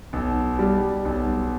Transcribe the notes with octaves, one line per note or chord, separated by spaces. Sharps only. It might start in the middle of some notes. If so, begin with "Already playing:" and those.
B1
G3
B1